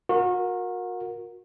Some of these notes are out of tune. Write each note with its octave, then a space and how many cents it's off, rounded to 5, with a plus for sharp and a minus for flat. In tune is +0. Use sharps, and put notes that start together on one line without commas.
F#4 -35 A#4 +0